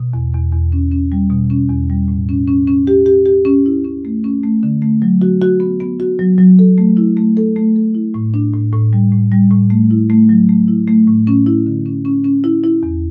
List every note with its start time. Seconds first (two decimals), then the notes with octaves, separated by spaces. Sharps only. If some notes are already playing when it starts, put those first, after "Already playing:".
Already playing: B2
0.14 E2
0.34 E2
0.52 E2
0.72 C#4
0.92 C#4
1.12 G3
1.30 B2
1.50 C#4
1.69 E2
1.90 G3
2.08 A2
2.29 C#4
2.48 C#4
2.68 C#4
2.87 G4
3.06 G4
3.26 G4
3.45 C#4
3.66 E4
3.84 C#4
4.05 A3
4.24 C#4
4.44 A3
4.63 D3
4.82 A3
5.02 F#3
5.22 F#4
5.42 F#4
5.60 B3
5.80 B3
6.00 F#4
6.19 F#3
6.38 F#3
6.59 A4
6.78 A3
6.97 E4
7.17 A3
7.37 A4
7.56 A3
7.76 A4
7.95 E4
8.14 A2
8.34 D4
8.53 A2
8.73 A2
8.93 G3
9.12 A2
9.32 G3
9.51 A2
9.70 A3
9.91 E4
10.10 A3
10.29 F#3
10.49 A3
10.68 E4
10.88 A3
11.07 A2
11.27 C#4
11.46 E4
11.67 D3
11.86 C#4
12.05 C#4
12.24 C#4
12.44 E4
12.64 E4
12.83 E2